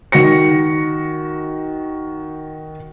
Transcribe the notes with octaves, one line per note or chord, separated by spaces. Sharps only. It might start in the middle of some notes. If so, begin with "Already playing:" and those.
D#3 F#4 A#6 C#7